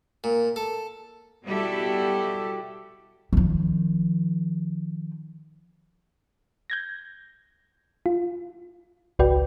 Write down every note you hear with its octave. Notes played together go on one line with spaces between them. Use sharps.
A#2
A4
B2 G3 E4 F#4 G4 A4
D#3 F3
G6 G#6 A#6
F4
G#1 C#2 F#4 B4 D5 G5